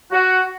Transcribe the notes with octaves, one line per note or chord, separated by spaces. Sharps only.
F#4